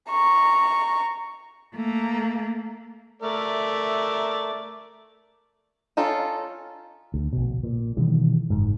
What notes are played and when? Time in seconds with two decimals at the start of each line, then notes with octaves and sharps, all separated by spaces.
0.10 A#5 C#6
1.76 A3 A#3
3.22 A3 A#4 D5 E5
5.97 C#4 D#4 F4 A4
7.14 D2
7.33 A#1 B2
7.63 A#2
7.97 B2 D#3 E3 G3
8.50 F#1 G#2